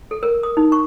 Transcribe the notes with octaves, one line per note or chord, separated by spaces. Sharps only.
A4
A#4
D#6
D#4
C#6